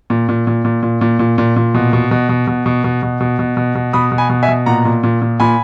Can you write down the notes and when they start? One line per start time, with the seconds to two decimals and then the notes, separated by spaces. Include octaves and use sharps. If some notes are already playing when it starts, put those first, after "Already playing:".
0.10 A#2
0.29 A#2
0.47 A#2
0.65 A#2
0.83 A#2
1.01 A#2
1.19 A#2
1.38 A#2
1.56 A#2
1.75 B2
1.93 B2
2.11 B2
2.29 B2
2.47 B2
2.66 B2
2.84 B2
3.03 B2
3.20 B2
3.39 B2
3.57 B2
3.75 B2
3.93 B2 B5 D#6
4.12 B2
4.18 G#5 B5
4.30 B2
4.43 E5 G#5
4.48 B2
4.66 A#2 F#5 A#5
4.85 A#2
5.03 A#2
5.22 A#2
5.40 A#2 G#5 B5